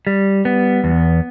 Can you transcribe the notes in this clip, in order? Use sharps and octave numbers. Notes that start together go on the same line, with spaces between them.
G3
B3
E2